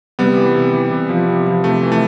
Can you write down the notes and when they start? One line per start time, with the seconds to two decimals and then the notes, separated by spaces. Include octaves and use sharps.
0.19 C3 G3 B3
0.37 E3
0.56 C3
0.73 E3
0.91 C3
1.09 F3
1.28 C3
1.47 F3
1.64 C3 A3
1.82 E3
1.92 A3